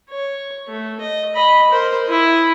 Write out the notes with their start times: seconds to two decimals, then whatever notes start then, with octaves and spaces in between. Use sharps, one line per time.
0.10 C#5
0.68 A3
1.00 D#5
1.35 D#5 B5
1.71 A#4 C5
2.08 E4 D#6